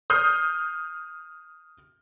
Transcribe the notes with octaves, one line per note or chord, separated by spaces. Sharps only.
D#6 F6 G6 C7